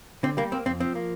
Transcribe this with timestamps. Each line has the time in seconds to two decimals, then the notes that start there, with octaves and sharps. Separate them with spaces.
0.23 D3 C4
0.37 G3 A#3
0.52 A#3 C4
0.66 F2 C4
0.80 F3 C4
0.95 A#3